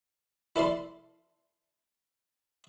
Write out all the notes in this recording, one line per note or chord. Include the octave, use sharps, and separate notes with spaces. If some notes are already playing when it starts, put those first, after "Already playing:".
E4 A4 D5 C6